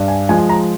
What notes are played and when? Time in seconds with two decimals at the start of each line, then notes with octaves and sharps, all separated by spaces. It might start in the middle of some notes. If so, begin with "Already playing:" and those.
Already playing: G2
0.08 G#5
0.29 F3 G#3 G#5
0.49 A#5